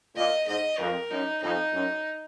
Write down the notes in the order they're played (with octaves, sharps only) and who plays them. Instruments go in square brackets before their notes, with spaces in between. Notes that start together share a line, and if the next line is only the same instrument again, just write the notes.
[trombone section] A#2 [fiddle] D#5
[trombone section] G#2 [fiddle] D#5
[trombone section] F2 [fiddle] A#4
[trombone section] F#2 [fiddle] D#4
[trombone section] F2 [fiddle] D#4
[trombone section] F#2